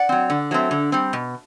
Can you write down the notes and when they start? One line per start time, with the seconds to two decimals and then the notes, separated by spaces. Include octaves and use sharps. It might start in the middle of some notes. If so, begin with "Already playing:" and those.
Already playing: D5 F#5
0.09 F#3 C4
0.30 D3
0.51 F#3 A3 C4
0.71 D3
0.92 G3 C4
1.13 B2